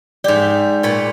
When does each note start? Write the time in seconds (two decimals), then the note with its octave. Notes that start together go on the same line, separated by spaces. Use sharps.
0.24 G#2 G4 D5
0.83 A#2 C#5 B5